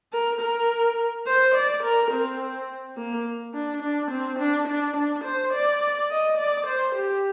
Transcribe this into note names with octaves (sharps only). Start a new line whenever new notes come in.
A#4
A#4
C5
D5
A#4
C4
A#3
D4
D4
C4
D4
D4
D4
C5
D5
D#5
D5
C5
G4